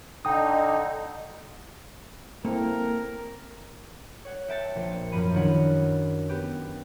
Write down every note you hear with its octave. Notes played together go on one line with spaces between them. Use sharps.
D3 D#4 G5 D#6
A#3 C4 E4 A4 A#4
C#5 F#5
E5 G5 A5 A6 C#7
A#1 C#7
F#2 F3 C5 B5 D#7
D#3 D4 E4 C#5 F#5 B5
B3 G4